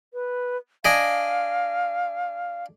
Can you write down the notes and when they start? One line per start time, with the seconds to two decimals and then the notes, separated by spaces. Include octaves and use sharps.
0.14 B4
0.85 D4 D#5 F5 G#5